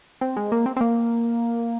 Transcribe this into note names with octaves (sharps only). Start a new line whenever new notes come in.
C4
G#3
A#3
C4
C4
A#3